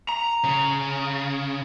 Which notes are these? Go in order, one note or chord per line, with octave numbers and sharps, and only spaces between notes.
A#5
C#3